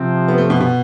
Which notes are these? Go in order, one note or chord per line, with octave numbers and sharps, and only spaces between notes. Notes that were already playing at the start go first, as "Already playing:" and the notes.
Already playing: C3 F3 C4
B3
A3
B2
B2